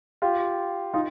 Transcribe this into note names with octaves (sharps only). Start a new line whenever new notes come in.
F4 G4
D#4 F4